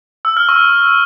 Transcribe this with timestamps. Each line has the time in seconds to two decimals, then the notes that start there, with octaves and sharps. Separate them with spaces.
0.25 E6
0.37 F6
0.49 C#6